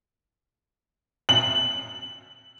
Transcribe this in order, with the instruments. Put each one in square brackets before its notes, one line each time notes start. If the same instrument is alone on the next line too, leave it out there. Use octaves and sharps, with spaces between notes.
[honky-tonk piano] F#7